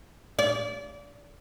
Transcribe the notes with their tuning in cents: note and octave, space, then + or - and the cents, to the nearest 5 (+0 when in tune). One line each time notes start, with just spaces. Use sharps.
D5 -30